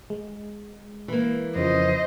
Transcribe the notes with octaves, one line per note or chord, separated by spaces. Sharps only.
G#3
E3 A#3
F2 C#3 F3 C5 D#5